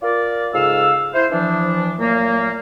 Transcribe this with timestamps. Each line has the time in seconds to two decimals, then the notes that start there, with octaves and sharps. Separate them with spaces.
0.03 F4 A#4 D5
0.54 G#2 C#3 A4 F5 E6
1.14 E4 C5
1.32 E3 F3 D4
1.99 A#2 F#3 A3 A#3